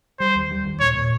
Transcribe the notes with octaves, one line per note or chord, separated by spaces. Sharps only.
G3 C5
D#2
G3
D#2
A#2 C#5
A#2